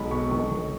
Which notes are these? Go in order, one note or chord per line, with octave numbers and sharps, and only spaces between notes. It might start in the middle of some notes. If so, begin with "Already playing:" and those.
Already playing: B1 G#3 B5
B2 C#6
B1 C#6
B1